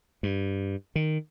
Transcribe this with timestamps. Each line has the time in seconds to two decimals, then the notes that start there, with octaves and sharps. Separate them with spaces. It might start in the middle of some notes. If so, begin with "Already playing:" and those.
0.23 G2
0.96 D#3